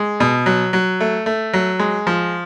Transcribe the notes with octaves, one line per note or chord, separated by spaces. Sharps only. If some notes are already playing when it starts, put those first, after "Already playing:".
Already playing: G#3
B2
F#3
F#3
A3
A3
F#3
G#3
F3